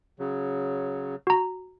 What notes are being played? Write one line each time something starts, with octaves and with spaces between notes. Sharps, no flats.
C#3 F#3
F#4 A#5